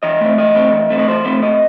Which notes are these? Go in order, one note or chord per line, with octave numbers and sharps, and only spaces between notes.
E3 D#5
A3 C4
E3 D#5
A3 C4
E3
A3 C4
D#5
E3 C5
A3 C4
C3 D#5